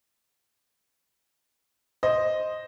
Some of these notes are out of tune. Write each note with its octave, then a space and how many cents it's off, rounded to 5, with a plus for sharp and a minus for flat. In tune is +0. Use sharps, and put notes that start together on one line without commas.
C5 +0 D#5 +0